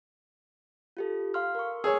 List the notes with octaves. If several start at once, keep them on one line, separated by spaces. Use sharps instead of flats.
F4 G4 A4
F5 C6 F6
A#4 C#6
G#4 B4 C#5 E6